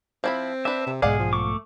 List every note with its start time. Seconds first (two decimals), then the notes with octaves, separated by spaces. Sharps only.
0.24 F3 C4 E4 B5
0.65 D4 B4 E5
0.87 C3
1.02 B1 G#2 B2 G#3 G#4 D5 F5 F#5
1.19 F3
1.33 A3 C#6 D6